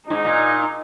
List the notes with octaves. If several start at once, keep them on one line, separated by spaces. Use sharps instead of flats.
G#2 D#4
A#2